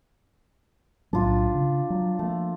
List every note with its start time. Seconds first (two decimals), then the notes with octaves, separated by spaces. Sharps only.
1.13 B1 A2 F#3 D4 F4
1.55 C#3
1.90 F#3
2.19 F3 A3 A#3